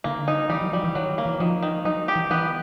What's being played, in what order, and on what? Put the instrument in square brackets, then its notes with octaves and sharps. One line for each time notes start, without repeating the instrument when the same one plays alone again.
[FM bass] D3 [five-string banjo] A#3
[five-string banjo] D#4
[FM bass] E3 [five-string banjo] G3
[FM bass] F#3
[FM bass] F3 [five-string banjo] G3
[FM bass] E3
[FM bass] D#3 [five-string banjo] F#3
[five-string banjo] A#3
[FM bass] E3
[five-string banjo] D#3 [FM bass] F3
[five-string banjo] D#3
[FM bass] F#3 [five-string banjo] D#4
[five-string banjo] G4
[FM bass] E3
[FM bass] E3 [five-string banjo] B3